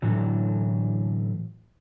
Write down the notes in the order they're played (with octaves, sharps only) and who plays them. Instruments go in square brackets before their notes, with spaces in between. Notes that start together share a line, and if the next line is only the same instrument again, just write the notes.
[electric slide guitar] A2 D3 E3 F#3